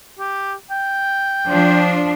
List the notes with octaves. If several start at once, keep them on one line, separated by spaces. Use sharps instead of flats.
G4
G5
F3 D4